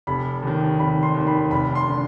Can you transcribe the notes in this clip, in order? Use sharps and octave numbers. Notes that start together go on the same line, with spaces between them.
F1 B5
D#2 D#3
F1 B5
C6
D#2 D#3
B5
F1 B5
C6
D3